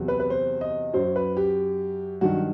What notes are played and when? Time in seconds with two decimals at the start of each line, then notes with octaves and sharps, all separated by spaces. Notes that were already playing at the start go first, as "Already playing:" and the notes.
Already playing: E2 C3 F#3
0.08 B4
0.20 B4
0.30 C5
0.61 D#5
0.93 F#2 F#3 C5
1.16 B4
1.37 G4
2.21 G2 D#3 F#3 F#4